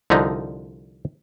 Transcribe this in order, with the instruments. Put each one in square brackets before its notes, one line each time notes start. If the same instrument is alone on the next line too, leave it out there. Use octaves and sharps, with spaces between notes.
[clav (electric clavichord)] C2 D3 F3 D#4